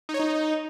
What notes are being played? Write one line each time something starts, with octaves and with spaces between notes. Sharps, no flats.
D#4
C#5
D#4